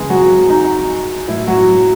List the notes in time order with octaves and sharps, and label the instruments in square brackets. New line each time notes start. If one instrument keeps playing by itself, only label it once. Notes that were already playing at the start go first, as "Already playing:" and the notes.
Already playing: [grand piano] C#3 E3 G#3 G#4
F#3 F#4
D#4
A2 F#3 E4
F#3 F#4